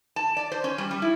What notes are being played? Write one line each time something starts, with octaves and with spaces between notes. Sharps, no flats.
A5
D5
C5
C#4
G3
G3
E4